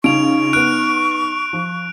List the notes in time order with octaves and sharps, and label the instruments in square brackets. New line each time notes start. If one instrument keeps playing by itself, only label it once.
[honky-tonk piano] C#3 F4 [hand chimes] D#4 [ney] C#6 [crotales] D7 F7
[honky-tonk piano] B3 F6 [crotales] F#6 D7
[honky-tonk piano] F3